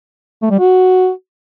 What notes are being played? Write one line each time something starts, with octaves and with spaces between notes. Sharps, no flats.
A3
G3
F#4